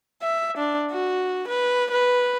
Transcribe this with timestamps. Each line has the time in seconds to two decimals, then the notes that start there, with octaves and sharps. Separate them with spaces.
0.22 E5
0.57 D4
0.91 F#4
1.48 B4
1.91 B4